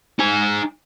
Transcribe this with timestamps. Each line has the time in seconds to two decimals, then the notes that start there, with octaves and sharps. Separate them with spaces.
0.19 D#4 G#5